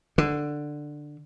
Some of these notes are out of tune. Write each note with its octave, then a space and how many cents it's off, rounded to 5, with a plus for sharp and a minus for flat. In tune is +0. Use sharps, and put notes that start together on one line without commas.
D3 +10